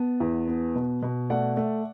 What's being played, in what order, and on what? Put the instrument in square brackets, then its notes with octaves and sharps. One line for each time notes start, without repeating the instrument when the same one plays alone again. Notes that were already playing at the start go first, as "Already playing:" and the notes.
Already playing: [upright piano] B3 A5
E2
B3
B2
B2
A3 D5 F#5
A3